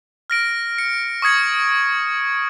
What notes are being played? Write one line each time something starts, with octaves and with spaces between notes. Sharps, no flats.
F6 A#6 D7
C#7
C#6 D#6 G#6 C#7